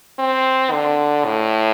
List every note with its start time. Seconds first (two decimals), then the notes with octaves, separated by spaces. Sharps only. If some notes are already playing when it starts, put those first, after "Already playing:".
0.19 C4
0.72 D3
1.25 A2